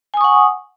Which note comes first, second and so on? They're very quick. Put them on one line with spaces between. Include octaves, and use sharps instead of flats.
G#5 D#6 C#6 F#5